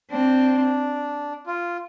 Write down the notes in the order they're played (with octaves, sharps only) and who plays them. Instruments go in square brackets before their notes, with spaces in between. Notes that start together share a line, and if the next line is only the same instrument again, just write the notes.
[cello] C4 [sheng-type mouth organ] D4
[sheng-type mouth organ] F4